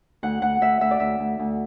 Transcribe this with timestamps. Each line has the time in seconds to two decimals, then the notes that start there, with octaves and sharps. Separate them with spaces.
0.23 D2 F#5
0.42 D2 F#5
0.61 D2 E5
0.81 D2 E5
0.91 D5
1.00 D2 E5
1.19 D2
1.39 D2